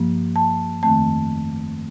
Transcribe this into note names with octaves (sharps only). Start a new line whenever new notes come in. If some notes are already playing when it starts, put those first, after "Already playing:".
Already playing: G2 F3 A#3
A5
F2 D#3 A3 C4 A5